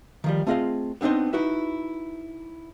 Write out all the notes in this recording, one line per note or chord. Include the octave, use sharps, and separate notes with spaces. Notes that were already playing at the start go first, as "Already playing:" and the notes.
D#3 F3 G3
A3 C4 F4 G#4 D#5 F5
B3 C4 D4 D#4 C5
D#4 E4 F#4 B4 E5